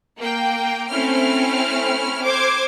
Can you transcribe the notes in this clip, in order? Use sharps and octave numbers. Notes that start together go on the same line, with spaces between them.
A#3 G5
A3 C4 C#4 E4 F6
C5 D6 G#6